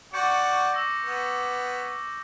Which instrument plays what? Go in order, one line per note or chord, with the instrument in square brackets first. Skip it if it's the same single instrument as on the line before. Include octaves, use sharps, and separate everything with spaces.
[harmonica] F#4 D5 F#5 [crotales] C#6 G6 C#7
[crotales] D6 E6 A#6
[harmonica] B3